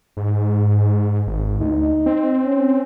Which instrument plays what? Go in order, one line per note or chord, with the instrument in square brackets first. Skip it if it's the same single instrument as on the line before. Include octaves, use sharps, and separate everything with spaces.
[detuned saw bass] G#2
G#1
[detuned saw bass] D2 [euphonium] D#4
[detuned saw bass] C4
[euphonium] C#4